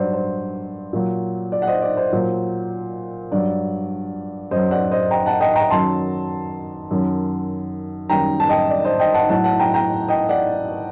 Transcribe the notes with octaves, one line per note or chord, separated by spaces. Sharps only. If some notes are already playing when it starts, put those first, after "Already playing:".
Already playing: G2 F#3 C5 D5
C5
A#2 F#3
D5
F#5
C5 D#5
D5
C5
A#2 F#3
G2 F#3 D5
F#2 F#3 C5 D#5
D5 F#5
C5 D#5
G5 A#5
F#5 A5
D#5 G5
G5 A#5
F#2 D#3 F#3 A5 C6
F#2 D#3 F#3
F#2 D#3 G3 G5 A#5
A5
D#5 G5
D5
C5 D#5
D#5 G5
F#5 A5
A2 F#3 F#5 A5
F#5 A5
G5 A#5
G5 A#5
D#5 G5
D5 F#5